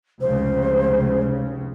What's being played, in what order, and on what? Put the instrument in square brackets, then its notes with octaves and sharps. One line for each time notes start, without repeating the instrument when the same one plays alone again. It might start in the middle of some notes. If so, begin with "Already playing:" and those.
[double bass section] F1 C#2 C#3 [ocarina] C5